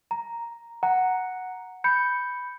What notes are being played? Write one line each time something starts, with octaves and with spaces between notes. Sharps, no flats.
A#5
F#5 A#5
B5 G6 C#7